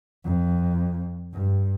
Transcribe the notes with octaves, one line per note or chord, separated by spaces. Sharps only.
F2
G2